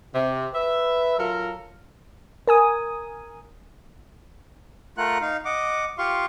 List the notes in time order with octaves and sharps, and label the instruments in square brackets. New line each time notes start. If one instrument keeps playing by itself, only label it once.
[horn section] C3
B4 E5
F#3 F4 A4 A#4
[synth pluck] A#4 G#5 D#6
[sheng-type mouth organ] A3 F4 A#4 F#5 F#6
D#4 F5
D#5 F#5 D6
F4 G4 F5 C6 C#6